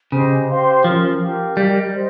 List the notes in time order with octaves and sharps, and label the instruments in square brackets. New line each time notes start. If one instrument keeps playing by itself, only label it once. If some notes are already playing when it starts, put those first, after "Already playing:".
[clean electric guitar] C#3 [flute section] G4 C5 D#5
[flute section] G4 C5 F5 C6
[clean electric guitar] F3 [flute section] C#4 F4 A#4
[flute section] G4 A#4 F5
[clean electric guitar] G3 [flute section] G4 A#4 D#5
[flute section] G#4 C5 D#5